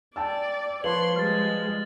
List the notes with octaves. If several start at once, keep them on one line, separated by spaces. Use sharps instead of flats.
D5 G5 A5 E6
F3 B4 C#5 C6 F#7
G3 G#3 F6 A6